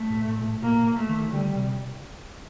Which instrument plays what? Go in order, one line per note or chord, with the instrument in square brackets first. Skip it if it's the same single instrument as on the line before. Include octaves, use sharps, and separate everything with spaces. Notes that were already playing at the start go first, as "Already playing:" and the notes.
Already playing: [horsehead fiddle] A3
[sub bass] A2
A2
A#2
A2
[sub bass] A#2 [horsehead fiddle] A#3
[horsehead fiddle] A3
[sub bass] D#3
[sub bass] D3 [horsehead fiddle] G3
[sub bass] C3